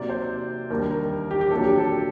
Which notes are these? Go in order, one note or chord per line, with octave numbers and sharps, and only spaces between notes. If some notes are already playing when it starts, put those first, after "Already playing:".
Already playing: C3 F#3 A#3 D#4 D5
C5
D#2 D#3 G3 D4 A#4
A#4
G4
G4
C2 A#2 F#3 A#3 D4 A4
G4
A4